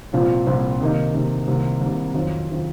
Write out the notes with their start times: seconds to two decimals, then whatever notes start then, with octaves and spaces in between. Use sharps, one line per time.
0.13 C2 A#2 F3 C4 F4
0.47 C2 A#2 F3 C4 F4
0.80 C3 D#3 A#3 D#4
1.14 C3 D#3 A#3 D#4
1.47 C2 C3 D#3 A#3
1.81 C2 C3 D#3 A#3
2.14 F2 D#3 F#3 C4 F4
2.50 D#3 F#3 C4 F4